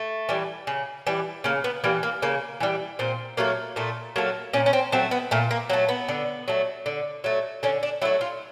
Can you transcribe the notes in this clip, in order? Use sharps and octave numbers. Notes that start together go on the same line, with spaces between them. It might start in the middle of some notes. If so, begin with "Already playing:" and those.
Already playing: A3
E3 G3
C#3
E3 G3
C#3 A#3
B3
E3 G3 A#3
A#3
C#3 A#3
E3 G3
A#2 C4
F#3 A3 A#3
A#2 A3
F#3 A3 A#3
A#2 C#4
C#4
C4
F#3 A3 C4
B3
A#2 A3
A#3
F#3 A3 A#3
B3
D3
F#3 A3
D3
F#3 A3
D3 C#4
D4
F#3 A3 E4
F4